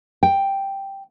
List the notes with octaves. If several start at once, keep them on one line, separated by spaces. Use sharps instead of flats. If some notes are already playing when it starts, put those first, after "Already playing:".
G5